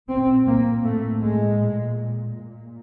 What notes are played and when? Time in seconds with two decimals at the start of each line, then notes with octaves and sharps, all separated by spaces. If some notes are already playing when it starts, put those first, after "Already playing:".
0.09 A#2 C4
0.46 A#3
0.83 A2 A3
1.21 G#3
1.59 A#2
2.33 A#2